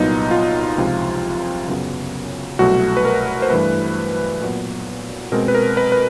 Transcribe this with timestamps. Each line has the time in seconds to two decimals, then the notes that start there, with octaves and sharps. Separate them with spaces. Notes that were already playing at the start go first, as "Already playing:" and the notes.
Already playing: C2 A#2 F#3 B3 D#4
0.31 F4
0.78 C#2 C3 F3
1.68 F#2 C#3 F#3 B3
2.59 C2 B2 F#3 A3 F#4
2.97 B4
3.05 A#4
3.42 C5
3.50 G2 E3 A3 B4
4.41 A#2 F#3 B3
5.32 B2 G#3 C4 A#4
5.48 B4
5.55 A#4
5.77 B4
5.92 B4